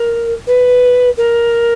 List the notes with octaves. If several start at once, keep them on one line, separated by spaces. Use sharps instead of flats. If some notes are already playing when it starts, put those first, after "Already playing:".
Already playing: A#4
B4
A#4